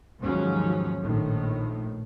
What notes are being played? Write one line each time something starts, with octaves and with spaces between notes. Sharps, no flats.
D#2 G#2 F3 F#3 C#4
A#1 A2 D#3